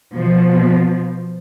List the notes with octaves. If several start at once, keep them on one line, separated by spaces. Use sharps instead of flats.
B2 F3